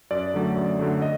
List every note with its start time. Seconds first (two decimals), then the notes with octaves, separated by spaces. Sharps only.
0.11 F#2 D5
0.34 D3 F#3 A3
0.56 F#2
0.79 D3 F#3 A3
1.02 D#5